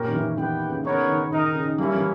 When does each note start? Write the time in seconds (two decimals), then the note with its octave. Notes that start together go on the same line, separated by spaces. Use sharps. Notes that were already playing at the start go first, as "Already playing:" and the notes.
Already playing: A#2 C#4 G4 A#4
0.08 D#3
0.15 E3
0.38 E3 B3 G4 B4 G5
0.69 C#3
0.85 C#3 B3 D#4 A#4 C#5
1.08 D#3
1.32 D#3 D#4 A#4 D#5
1.55 C#3
1.78 G3 A#3 C#4 E4
1.94 E3